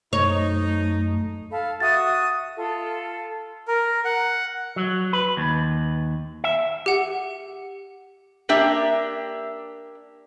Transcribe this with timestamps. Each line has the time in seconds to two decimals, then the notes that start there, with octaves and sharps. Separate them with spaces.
0.13 F#2 A3 D#4 C#5
1.52 A4 F5 B5
1.80 F#4 E5 D#6 A6
2.56 F4 A4
3.68 A#4
4.05 F#5
4.76 F#3
5.13 B4
5.37 D#2
6.44 E5
6.86 G4 F#5
8.49 A#3 D4 G4 E5